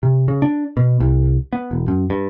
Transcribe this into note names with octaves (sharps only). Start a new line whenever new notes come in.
C3
C#3
D4
B2
C2
B3
E1
F#2
G2